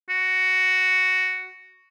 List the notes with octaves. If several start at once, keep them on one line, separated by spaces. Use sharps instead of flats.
F#4